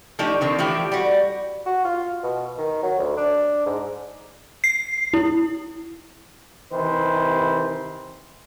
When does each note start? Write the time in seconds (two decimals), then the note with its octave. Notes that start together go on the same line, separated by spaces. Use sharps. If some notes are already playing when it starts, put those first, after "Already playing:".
0.19 F3 A3 D4 D#4 G4
0.41 D3 D#3 C4
0.59 E3 F3 A3 G4
0.92 G3 F#4
1.66 F#4
1.85 F4
2.24 B2
2.58 D#3
2.83 F#3
2.99 D2
3.17 D4
3.66 G#2
4.64 C7
5.14 E4
6.72 C3 D#3 E3 C5